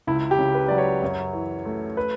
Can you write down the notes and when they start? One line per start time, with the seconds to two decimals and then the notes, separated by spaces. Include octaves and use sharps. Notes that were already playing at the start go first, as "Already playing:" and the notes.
0.07 C#2 E4
0.31 G4
0.39 C#3
0.54 B4
0.68 F#3 D5
0.78 C#5
1.02 F#2
1.33 E3
1.65 A3
1.97 B4